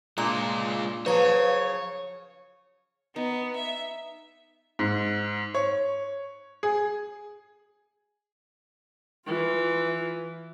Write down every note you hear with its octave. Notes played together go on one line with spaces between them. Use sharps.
A#2 G#3 D4 F4 D6
C#3 F3 F#3 B4 C#5 A#5
B3 D#4
E5
G#2
C#5
G#4
E3 F4